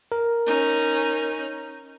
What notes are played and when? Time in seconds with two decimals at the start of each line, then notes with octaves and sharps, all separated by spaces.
0.12 A#4
0.47 C#4 D#4